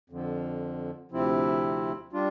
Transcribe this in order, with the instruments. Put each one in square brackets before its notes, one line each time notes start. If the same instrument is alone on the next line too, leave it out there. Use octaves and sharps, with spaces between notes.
[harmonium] F2 D3 F3
D2 C3 F3 C4 E4
G3 D4 F4